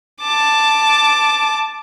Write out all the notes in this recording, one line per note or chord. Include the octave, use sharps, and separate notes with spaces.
A5 D6